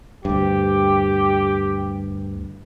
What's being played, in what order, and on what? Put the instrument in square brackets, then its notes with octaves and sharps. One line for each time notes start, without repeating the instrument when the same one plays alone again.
[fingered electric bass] D2 G2 [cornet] G4